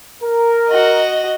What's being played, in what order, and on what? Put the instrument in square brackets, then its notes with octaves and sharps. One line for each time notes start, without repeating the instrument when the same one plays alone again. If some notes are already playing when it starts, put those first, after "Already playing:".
[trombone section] A#4
[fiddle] F#4 D#5